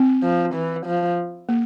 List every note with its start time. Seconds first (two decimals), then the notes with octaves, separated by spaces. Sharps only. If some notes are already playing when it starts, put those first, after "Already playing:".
Already playing: C4
0.23 F3
0.55 E3
0.86 F3
1.49 A#3